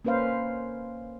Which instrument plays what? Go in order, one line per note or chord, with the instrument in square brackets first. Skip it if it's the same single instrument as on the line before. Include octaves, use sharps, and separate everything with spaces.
[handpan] A#3 C#4 B4 C5 F5